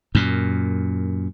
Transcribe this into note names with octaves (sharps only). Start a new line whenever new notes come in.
F#2 A#2